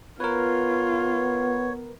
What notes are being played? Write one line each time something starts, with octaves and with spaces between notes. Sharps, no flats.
B3 F4 A#4 B4 C#5